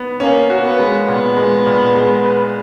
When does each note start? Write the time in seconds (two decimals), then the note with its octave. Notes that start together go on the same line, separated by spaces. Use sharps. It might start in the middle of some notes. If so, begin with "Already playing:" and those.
Already playing: B3
0.20 A#3 C#4
0.50 F#4
0.64 B3
0.79 G#3
1.08 A#2 B3
1.37 G#3
1.66 A#2
1.95 G#3
2.25 B4